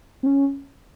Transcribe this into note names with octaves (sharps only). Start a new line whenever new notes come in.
C4
C#4